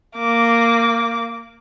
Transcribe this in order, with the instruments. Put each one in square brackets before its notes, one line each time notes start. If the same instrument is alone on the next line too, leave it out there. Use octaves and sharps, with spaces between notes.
[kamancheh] A#3 D6